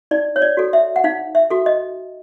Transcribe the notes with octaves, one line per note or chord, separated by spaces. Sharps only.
D#4 D5
C#5
D5
F#4 A4
E5
F#5
D#4 F5
E5
F#4 A4
D#5